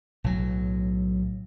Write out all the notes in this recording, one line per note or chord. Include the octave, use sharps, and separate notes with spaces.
B1 A2 F#3